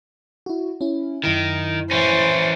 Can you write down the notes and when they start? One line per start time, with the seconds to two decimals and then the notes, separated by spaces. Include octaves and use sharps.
0.46 E4 F#4
0.81 C#4 E4
1.24 F#2 D#3 E4
1.91 E3 C#4 C5